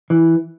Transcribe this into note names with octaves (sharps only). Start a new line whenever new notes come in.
E3